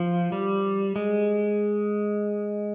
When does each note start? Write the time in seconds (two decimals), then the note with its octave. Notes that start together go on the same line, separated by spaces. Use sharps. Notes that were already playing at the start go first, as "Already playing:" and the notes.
Already playing: F3
0.32 G3
0.96 G#3